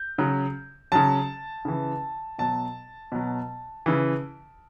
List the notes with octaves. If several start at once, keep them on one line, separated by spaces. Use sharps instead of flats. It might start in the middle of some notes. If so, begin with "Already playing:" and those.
Already playing: G6
C#3 F#3
C#3 F#3 A5
C#3 E3
B2 F#3 A5
B2 F#3
C#3 E3